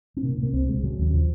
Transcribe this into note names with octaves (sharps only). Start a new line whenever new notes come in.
C4
C3 A#3
C3 A#3
C#2 C4
C3 G#3
C#3 F#3
D#2
C#3 F3